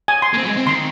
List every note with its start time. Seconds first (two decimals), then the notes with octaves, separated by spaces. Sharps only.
0.08 G#5
0.22 C6
0.33 A#3
0.37 C4
0.43 F#3
0.47 G#3
0.56 C4
0.66 D#3 C6